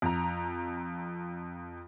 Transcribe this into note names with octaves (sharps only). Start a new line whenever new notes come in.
F2 A#5